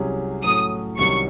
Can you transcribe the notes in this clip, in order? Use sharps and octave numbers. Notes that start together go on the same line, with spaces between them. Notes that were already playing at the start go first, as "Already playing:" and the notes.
Already playing: C2 C3 F#3 C#4 G#4
A2 F#3 C#4 F#4 A4 D#6
C2 C3 D#3 F#3 C#4 C#6